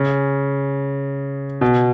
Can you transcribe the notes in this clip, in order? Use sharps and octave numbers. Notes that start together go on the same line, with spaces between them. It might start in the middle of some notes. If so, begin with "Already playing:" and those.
Already playing: C#3
B2